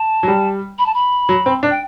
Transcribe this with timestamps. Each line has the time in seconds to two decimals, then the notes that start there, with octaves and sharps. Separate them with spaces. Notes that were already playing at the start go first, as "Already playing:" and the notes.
Already playing: A5
0.23 F#3
0.28 G3
0.79 B5
0.86 A5
0.94 B5
1.29 F#3
1.46 C4
1.63 D4
1.71 G5